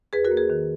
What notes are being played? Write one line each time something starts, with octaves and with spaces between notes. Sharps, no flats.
E2 G#4 B4
F#4 A#4
A#3
G#4 B4
D#3